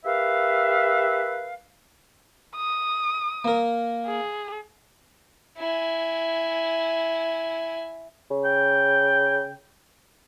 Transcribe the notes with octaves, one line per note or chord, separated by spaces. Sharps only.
G4 A#4 B4 E5 F5
D#6
A#3 A#4
G#4
E4 G#5
C#3
G5